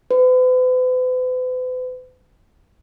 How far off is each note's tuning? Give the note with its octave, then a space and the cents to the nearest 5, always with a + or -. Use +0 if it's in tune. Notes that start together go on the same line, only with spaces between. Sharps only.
B4 +45